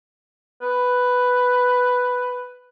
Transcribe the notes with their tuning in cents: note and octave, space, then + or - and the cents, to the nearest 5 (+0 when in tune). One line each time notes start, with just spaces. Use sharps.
B4 +5